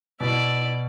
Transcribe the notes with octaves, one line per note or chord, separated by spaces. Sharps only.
B2 E4 D5